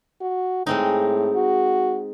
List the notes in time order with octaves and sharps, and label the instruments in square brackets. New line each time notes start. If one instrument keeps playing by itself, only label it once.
[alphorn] F#4
[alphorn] A2 [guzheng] G#3 C4 D#4
[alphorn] F#4